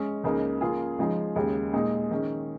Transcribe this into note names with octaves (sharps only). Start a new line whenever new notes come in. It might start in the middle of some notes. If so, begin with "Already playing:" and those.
Already playing: G#3 C#4
C#2 C#3 A#3 D#4
C#3 A#3 F4 G#4
C#3 F3 G#3 D#4 G#4
D#2 C#3 G#3
A#2 G#3 D#4 G#4
D#3 C#4 G#4